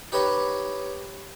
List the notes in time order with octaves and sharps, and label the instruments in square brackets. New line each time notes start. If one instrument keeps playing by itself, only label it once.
[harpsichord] D#4 G4 B4 C#5 D#5